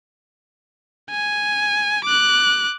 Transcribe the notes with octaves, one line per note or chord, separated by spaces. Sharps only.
G#5
D6 F#6